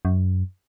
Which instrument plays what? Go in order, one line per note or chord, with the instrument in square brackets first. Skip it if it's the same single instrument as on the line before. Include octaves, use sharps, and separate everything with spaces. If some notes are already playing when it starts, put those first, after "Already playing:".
[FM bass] F#2